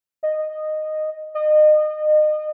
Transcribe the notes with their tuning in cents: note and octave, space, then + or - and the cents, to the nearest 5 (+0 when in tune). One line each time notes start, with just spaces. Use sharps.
D#5 -10
D#5 -30